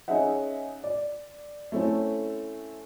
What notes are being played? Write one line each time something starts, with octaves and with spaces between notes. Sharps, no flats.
C#4 D#4 G#4 D#5 E5 F#5
D5
A3 C4 C#4 E4 A4